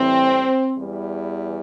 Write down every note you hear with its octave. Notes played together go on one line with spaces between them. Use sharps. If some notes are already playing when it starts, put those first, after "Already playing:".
Already playing: A2 E3 G3 C4
E2 E3 G3